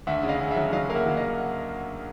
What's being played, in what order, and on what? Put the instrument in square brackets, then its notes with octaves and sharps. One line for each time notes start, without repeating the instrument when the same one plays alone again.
[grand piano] D2 E5 F#5
C#3
D#5 F5
C#3
E5 F#5
F#3
F#3 D#5 F5
A#3 F5
E5 F#5
F#3
D#5 F5